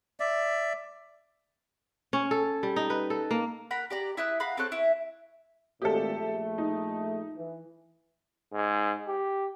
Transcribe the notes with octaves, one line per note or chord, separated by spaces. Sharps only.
D5 E5
C#4
A4
G3
D#4
B4
A4
A#3
A#4 F#5 B5
G4 D5 A#5
E4 E5 D#6 F#6
F5 F#5 A#5 B5
C4 A4 C#5 F#6
E4 E5
G#1 A#2 A3 G4 A4
A#1 A3
D#4
E3
G#2
G4